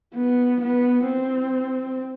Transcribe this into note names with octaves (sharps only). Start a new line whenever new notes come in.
B3
B3
C4